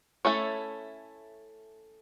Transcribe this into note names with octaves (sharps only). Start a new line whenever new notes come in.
A3 C#4 E4 A4 C#5